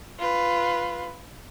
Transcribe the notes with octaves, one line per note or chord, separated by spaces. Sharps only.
F4 B4